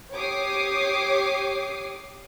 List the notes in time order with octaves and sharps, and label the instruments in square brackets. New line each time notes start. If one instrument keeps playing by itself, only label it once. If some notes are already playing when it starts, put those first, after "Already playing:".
[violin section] G4 C#5 D6 D#6 C7